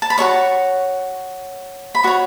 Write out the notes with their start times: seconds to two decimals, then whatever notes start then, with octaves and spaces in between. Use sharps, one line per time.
0.02 A5
0.10 B5
0.18 F#4 A4 C#5 C#6
1.95 B5
2.03 F#4 C#5 C#6